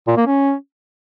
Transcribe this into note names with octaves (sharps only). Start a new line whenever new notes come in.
A#2
A#3
C#4